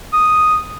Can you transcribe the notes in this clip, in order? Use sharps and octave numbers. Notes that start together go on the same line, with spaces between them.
D#6